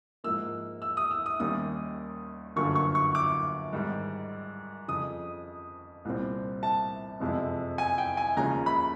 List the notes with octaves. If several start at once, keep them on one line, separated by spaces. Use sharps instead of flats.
G#2 F3 A#3 E6
E6
D#6
E6
D#6
D#2 D#3 G3 A#3 C#4 D#6
G1 F#2 D3 F#3 A#3 C#6
C#6
C#6
D6
G#2 D#3 G3
F2 C#3 F3 D#6
C2 A#2 G3 C4
A5
F#1 F2 C3 F3 G#3
G#5
G5
G#5
D#2 C#3 F3 G#3 C#4 A#5
B5